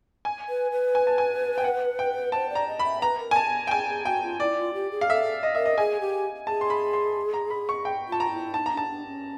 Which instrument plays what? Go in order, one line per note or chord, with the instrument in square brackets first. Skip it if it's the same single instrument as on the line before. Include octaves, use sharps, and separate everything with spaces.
[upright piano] G#5
[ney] B4
B4
[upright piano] G#5
A5
G#5
G5
F#5
G5
[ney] C5 [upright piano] A5
[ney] D5
[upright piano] A#5
[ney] D#5
[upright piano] B5
[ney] E5
[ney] B4 [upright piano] A#5
[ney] A#4
[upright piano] G#5
A5
G5
[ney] G#4 [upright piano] G#5
[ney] G#4
[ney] F#4 [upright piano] G5
[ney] F4
[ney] E4 [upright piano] D5
[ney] F4
G4
G#4
[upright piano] F5
[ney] A4 [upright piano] E5
[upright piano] D#5
[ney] A#4 [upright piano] E5
[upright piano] D#5
[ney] G#4 [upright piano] G#5
[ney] G4
[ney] G#4 [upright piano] A5
[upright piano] C6
B5
C6
A#5
B5
C#6
G5
[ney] F4 [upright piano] A5
[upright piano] A#5
[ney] E4
[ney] D#4 [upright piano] A5
[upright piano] A#5
[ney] D4
[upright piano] A5
[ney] D4
C#4